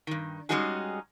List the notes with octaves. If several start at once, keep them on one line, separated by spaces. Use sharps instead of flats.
G2 D#3
G3 G#3 C#4 D#4 F#4 G#4